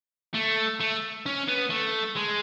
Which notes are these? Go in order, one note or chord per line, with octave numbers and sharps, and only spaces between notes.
A3
A3
C#4
B3
A3
G#3